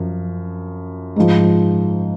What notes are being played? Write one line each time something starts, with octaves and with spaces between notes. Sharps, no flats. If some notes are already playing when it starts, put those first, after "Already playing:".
Already playing: F#2 F3
G#2 F3